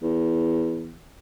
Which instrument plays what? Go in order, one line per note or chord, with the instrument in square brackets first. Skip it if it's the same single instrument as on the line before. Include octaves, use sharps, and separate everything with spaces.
[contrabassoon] E2